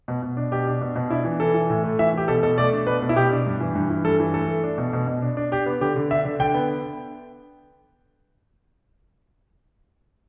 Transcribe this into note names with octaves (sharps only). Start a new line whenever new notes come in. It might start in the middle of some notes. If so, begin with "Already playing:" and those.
B2
B2
D4
B2 G4
D4
B2
B2
D4 E4
E3
E3 A4
E3
A2
A3
E3 E5
E3 G4
B2 A4
B2 A4
A3 D5
D4
B2 B4
B2
E4
B2 G4
D4
G2
E3
G2
E3
G2 A4
E3
A3 A4
A3
D4
B2
B2
B2
D4
D4
D4 G4
B3
D3 G4
D3
D4 E5
D3
D3 G5
B3